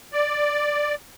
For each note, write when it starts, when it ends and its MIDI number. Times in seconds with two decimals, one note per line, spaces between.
0.13 0.94 74